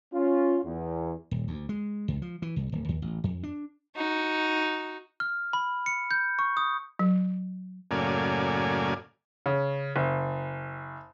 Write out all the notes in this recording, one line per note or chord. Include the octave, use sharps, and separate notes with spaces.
C#4 F4
E2
D#1
D2
G#3
C#2
F3
E3
C2
D1
D#2
A1
F2
D4
D#4 F#4
F6
B5
C#7
G6
C#6
D#6
F#3
F#2 A2 C#3 A#3 D5 G#5
C#3
F#1